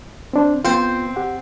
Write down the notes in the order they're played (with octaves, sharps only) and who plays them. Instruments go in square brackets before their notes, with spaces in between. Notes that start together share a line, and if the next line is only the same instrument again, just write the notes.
[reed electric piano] C4 D4 C5
[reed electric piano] B3 F4 [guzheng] C4 C5
[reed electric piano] G4 F#5